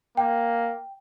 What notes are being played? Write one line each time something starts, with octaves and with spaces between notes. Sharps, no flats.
A#3 G5